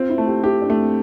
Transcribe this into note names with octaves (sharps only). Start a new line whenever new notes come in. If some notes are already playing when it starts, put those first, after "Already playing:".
Already playing: C4 F4
E4
A3
G4
E4 G4
D4
A3
C4